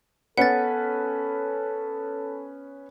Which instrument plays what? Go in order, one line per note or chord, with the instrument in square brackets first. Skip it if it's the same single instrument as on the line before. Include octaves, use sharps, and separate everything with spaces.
[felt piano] B3 C#4 B4 [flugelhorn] A4 [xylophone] F#5 A6